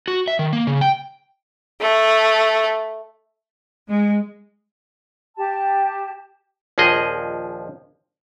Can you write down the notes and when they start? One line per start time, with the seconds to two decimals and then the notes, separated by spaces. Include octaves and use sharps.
0.08 F#4
0.28 E5
0.39 D#3
0.53 A#3
0.67 C#3
0.81 G5
1.81 A3
3.89 G#3
5.37 G4 A5
6.78 A#1 D#2 F3 G#4 D#5